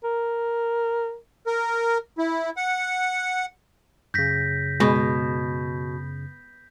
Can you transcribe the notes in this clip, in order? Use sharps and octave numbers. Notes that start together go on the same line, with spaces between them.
A#4
A#4
E4
F#5
F#2 C#3 G6 A#6 B6
B2 G#3